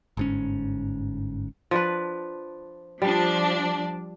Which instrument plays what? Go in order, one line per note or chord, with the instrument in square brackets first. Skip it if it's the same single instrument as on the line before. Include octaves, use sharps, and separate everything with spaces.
[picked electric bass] G1 G#2 C#4
[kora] F3 D4 B4
[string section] F3 D4 [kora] G3